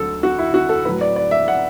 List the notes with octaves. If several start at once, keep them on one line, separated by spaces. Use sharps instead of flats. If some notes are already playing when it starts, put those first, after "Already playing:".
Already playing: D2 D3 F#3 A4
F#4
E4
F#4
A4
A2 F#3 B4
D5
D5
E5
F#5